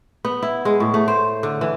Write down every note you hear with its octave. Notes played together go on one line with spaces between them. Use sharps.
B3
E4
G#3
A2
A3
C5
D3
E3